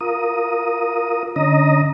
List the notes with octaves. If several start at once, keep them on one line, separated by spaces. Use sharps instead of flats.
F4 A#4 D#6
D3 C#4 D#5 A#5 D#6